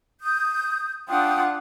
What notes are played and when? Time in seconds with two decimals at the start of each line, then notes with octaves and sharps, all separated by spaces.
0.22 D#6 G6
1.09 D4 F4 F#5 G5 D#6